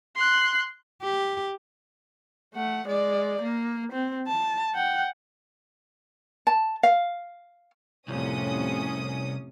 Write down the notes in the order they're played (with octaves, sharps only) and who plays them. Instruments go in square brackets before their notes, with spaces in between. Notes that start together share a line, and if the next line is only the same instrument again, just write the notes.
[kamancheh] C6 F#6
[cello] G4
[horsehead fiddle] A3 F#5
G#3 D5
A#3
C4
A5
F#5 G5
[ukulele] A5
F5
[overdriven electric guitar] C2 [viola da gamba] F2 A2 [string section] C3 C#4 D#6